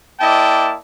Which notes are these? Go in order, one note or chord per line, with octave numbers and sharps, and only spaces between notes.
A#3 E4 D5 D#5 G5 A5